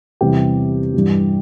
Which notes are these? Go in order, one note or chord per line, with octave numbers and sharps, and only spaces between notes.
E2 C3 E3 G3 G4
G2 E3 G3